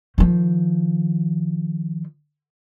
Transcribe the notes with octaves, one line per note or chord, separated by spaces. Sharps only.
D#3 F3